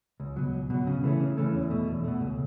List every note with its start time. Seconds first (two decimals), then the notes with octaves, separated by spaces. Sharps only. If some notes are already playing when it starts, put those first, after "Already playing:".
0.20 C#2
0.36 B2 F#3
0.53 C#2
0.70 B2 F#3
0.87 C#3
1.03 E3 A3 C#4
1.20 C#3
1.37 E3 A3 C#4
1.54 E2
1.70 B2 A3
1.87 E2
2.04 B2 A3
2.21 C#2